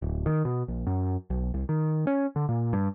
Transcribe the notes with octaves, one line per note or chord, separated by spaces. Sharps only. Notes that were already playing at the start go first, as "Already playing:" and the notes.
D1
D#3
B2
A#1
F#2
B1
C2
D#3
C#4
D3
A#2
G2